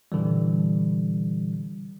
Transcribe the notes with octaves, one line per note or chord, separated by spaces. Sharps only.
A#2 D3 E3 G3